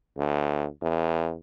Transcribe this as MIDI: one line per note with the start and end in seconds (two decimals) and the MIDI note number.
0.17 0.68 38
0.82 1.36 40